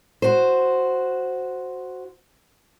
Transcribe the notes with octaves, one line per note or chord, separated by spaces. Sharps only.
F#4 C5